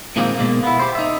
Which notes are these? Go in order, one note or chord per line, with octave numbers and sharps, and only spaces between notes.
A#2 D#3 F3 G#3 A#3 C4
B2 G#3 A#3
B3 E4
G4 C5
D#4 E5